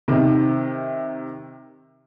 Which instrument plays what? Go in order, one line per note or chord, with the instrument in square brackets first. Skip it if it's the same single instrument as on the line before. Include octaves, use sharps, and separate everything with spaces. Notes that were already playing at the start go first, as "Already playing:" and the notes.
[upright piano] C3 D#3